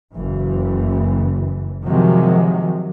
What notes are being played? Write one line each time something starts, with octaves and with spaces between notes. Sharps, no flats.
F#1 E3
C3 D#3 F3 F#3 G#3